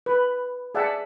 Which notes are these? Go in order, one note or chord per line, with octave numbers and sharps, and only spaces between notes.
B4
G#4 D5 E5 F#5 G5 A5